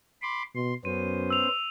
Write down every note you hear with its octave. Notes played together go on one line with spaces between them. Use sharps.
B5 C6 D6
B2 C6
F#2 B3 C#4 C5 D#7
E6 F7